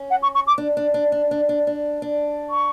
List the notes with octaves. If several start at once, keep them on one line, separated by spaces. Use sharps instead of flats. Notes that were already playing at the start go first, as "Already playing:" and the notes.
Already playing: C#4
F#5
C#6
C#6
D6
D4
D4
D4
D4
D4
D4
D4
D4
C#6